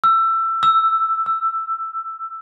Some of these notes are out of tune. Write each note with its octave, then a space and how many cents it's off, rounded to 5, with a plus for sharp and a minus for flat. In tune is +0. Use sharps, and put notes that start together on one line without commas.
E6 +20
E6 +5
E6 +15